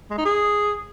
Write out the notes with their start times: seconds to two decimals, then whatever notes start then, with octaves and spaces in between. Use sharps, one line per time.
0.10 G#3
0.18 D#4
0.25 G#4